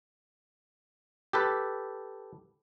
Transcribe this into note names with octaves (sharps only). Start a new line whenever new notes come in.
G4 A4 B4